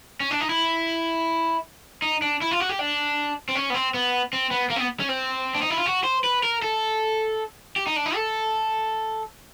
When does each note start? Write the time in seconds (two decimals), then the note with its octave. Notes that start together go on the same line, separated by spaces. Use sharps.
0.20 C#4
0.31 D4
0.41 D#4
0.49 E4
2.02 D#4
2.22 D4
2.42 E4
2.51 F4
2.60 F#4
2.69 G4
2.79 D4
3.49 C4
3.55 C#4
3.70 B3
3.74 C4
3.94 B3
4.33 C4
4.51 B3
4.70 A#3
4.76 C4
4.80 B3
5.00 C#4
5.09 C4
5.55 D4
5.62 D#4
5.70 E4
5.78 F4
5.86 F#4
6.04 C5
6.24 B4
6.43 A#4
6.62 A4
7.76 G4
7.87 D#4
7.96 D4
8.06 D#4
8.15 A4